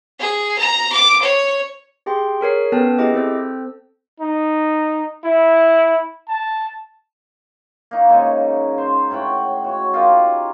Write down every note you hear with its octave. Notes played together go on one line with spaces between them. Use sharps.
G#4
A#5
D6
C#5
G4 G#4 G5 C6
G#4 A#4 C#5 C7
B3 C#4 A4 B4 G5 A5
E4 G4 G#4 D#5 D6
C4 A4 C5 E6
D#4
E4
A5
A#3 D#4
G#2 C#3 D#4 C#6
C5
A2 C#5 F#5 G5
F#4 C#5
D#4 F4 G4 A#4